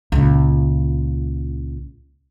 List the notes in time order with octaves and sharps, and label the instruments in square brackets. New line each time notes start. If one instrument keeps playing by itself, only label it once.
[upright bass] C#2 A#2